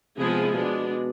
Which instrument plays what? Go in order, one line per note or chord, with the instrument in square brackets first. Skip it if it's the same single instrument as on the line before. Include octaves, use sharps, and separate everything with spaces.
[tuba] C3 [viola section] F3 G#3 B3 E4 G#4
[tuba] B2 [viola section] G#3 B3 D4